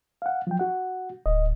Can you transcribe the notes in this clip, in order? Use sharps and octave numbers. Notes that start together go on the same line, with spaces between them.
F5 F#5
F3 F#3 G5
F#4 F#5
D1 D#5